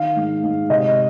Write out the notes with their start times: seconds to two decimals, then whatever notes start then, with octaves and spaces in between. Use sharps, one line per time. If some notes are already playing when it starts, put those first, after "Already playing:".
Already playing: D#3 F5
0.16 G#2
0.43 G#2
0.70 C3 D#5